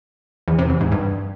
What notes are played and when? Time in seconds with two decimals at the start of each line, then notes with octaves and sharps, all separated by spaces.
0.48 E2
0.59 C3
0.70 E2
0.81 G#2
0.92 G2